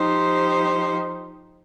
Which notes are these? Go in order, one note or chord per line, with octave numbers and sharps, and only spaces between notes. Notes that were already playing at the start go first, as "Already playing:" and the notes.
Already playing: F3 D#4 G4 C5